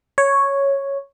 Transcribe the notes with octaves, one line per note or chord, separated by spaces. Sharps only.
C#5